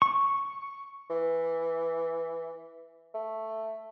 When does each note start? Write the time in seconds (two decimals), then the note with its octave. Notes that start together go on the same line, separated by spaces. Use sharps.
0.02 C#6
1.10 E3
3.14 A3